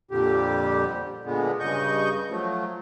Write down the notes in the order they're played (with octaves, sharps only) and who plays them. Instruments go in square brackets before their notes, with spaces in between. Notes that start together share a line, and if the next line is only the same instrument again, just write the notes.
[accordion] F2 A#2 D3 G3 G4
A#2 D3 G#3 B3
G2 C#3 D#5 C#6 G6
F3 F#3 A3